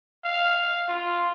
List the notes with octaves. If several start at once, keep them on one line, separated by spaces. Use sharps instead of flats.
F5
F4